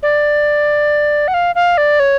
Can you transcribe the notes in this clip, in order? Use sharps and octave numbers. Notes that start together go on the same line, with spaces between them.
D5
F#5
F5
F5
D5
C#5